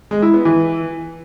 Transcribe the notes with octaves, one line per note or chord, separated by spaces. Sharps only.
G#3
E4
B3
E3